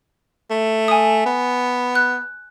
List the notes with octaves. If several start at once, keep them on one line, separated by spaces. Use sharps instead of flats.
A3
G#5 D#6
B3
F#6